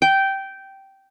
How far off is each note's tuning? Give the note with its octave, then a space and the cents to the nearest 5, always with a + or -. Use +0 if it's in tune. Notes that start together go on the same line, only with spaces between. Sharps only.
G5 -10